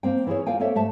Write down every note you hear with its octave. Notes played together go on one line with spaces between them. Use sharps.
A#3 C4 G5
E3 E4 G4 G#4 C#5
A#3 F4 A#4 F5 G5 G#5
A#3 C4 A4 C#5 E5
G#2 A3 E5 A5